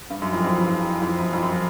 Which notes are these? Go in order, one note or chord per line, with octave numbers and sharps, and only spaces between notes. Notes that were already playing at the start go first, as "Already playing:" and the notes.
G2
F#2
F2
F#2
F2
E2
F2
F#2
F2
F#2